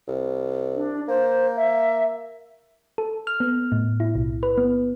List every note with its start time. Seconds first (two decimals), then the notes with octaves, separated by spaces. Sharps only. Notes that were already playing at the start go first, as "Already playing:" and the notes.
0.08 C2
0.76 D4
1.08 A#3 C5
1.56 E5
2.98 A4
3.27 F6
3.40 B3
3.72 A2
4.00 E4
4.15 B1
4.43 B4
4.58 B3